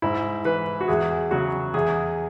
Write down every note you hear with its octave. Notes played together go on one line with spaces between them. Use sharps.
G#2 E4
E3 B4
F#4
E2 G#4
C#3 F#3 F#4
E2 G#4